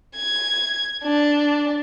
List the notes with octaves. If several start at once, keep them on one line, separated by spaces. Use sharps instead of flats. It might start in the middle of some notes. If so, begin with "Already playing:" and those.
G#6
D4